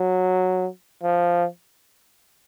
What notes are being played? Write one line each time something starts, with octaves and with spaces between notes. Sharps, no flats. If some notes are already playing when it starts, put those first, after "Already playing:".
Already playing: F#3
F3